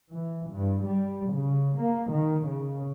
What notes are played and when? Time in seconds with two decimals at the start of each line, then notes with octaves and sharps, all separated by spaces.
0.11 E3
0.52 G2
0.86 G3
1.32 C#3
1.78 A#3
2.12 D#3
2.47 C#3